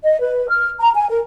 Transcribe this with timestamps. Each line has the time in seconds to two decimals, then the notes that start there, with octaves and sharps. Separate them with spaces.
0.04 D#5
0.21 B4
0.49 F6
0.80 A#5
0.95 G#5
1.10 A#4